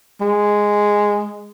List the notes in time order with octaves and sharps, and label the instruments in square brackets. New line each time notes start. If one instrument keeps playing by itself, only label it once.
[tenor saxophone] G#3